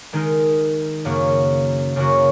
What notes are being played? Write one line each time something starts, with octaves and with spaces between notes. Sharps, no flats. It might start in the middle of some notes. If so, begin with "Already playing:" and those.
D#3 G#3 D#4 A#4
F#2 C#3 A#3 F#4
F#2 C#3 A#3 F#4